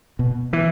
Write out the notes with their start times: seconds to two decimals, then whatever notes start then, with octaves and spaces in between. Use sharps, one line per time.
0.19 B2
0.53 E3